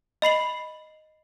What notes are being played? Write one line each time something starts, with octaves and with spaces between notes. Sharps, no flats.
D#5 B5 C7 F#7